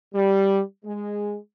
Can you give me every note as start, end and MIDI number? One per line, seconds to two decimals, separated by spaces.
0.14 0.60 55
0.85 1.36 56